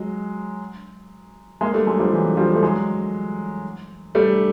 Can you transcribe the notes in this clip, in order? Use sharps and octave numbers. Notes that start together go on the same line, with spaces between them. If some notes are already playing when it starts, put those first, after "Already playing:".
Already playing: F#3 G#3
G#3 A#3
G3 A3
F#3 G#3
F3 G3
E3 F#3
F3 G3
A3
F#3 G#3
G3 A3